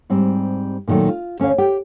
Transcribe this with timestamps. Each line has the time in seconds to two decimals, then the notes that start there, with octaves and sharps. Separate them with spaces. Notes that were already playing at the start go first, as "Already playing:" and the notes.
0.10 G#2 G3 C4
0.88 A#2 D3 D#3 F#3 A3
1.09 F4
1.40 D2 C#4 B4 C#5 F5
1.58 G4 G5